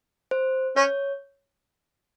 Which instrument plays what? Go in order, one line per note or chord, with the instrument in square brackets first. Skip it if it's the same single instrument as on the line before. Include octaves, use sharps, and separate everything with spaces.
[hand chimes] C5
[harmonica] C#4 [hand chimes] C#5